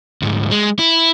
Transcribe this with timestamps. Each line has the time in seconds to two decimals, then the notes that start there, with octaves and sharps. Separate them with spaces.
0.22 D2 G#2
0.51 G#3
0.79 E4